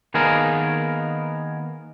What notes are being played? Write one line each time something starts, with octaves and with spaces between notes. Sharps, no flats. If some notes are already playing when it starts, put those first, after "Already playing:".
D#3 A#3 B3 G#4 A#4